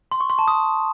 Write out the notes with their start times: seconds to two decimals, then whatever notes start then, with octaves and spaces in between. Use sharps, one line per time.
0.12 C6
0.21 C#6
0.30 C6
0.39 A5
0.48 D#6